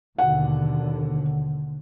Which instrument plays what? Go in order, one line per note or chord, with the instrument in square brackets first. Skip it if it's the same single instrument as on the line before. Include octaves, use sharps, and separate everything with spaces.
[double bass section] D#2 B2 D3 [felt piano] F#5